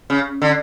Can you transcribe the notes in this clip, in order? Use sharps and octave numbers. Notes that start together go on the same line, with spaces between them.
C#3
D3